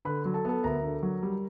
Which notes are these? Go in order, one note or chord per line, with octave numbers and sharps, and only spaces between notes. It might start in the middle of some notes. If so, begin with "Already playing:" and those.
D3 B4 B5
F#3
A4 A5
B3 A4 A5
D2 A#4 A#5
D3
F#3
G3